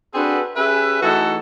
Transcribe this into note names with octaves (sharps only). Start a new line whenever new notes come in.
C4 D4 F#4 G#4 A4 B4
C#4 G4 G#4 B4 E5
E3 A3 D#4 F#4 G#4 A4